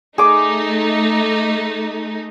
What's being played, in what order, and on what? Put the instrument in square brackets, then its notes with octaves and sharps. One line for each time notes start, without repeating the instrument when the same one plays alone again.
[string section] A3 D#4 [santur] G#4 D6